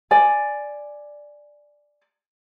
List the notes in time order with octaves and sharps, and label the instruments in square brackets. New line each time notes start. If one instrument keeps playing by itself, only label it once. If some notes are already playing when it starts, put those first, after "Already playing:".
[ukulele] D5 G#5